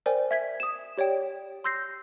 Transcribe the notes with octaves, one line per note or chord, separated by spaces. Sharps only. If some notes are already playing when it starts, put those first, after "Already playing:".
A#4 C5 D5 G5 G#5
E5 G#6 B6
D#6 E7
G4 C#5 D5 G5
C6 E6 G6 A#6 C7